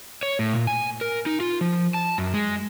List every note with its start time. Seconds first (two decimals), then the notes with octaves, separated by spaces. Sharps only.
0.23 C#5
0.39 A2
0.53 A#2
0.67 G#5
1.01 A#4
1.26 D#4
1.40 F4
1.61 F3
1.94 A5
2.18 F#2
2.34 G#3